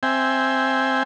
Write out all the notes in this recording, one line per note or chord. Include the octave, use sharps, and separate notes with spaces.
C4 E5 G5 G#5